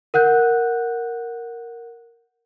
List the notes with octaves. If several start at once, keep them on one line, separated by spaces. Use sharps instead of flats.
A#4 F#5 F#6 G6